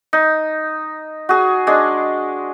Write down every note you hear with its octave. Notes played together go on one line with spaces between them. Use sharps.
D#4
F#4 G#4
G#3 D4